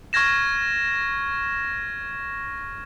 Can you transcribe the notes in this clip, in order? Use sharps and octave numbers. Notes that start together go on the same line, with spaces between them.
C#6 F6 G#6 A#6 E7